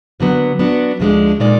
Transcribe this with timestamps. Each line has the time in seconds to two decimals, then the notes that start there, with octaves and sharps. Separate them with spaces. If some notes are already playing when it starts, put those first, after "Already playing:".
0.20 D#2 D3 F#3 B3
0.59 F#3 B3 D4 F#4
1.00 D2 D3 F3 G#3 D4
1.40 A#2 G#3 D#4 A#4 D5